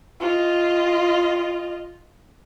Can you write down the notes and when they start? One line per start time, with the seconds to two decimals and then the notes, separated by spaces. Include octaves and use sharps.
0.21 F4 D#5